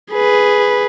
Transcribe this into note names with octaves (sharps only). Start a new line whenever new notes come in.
G#4 B4